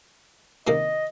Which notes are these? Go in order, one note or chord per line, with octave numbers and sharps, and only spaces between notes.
C3 D#3 A#3 D#5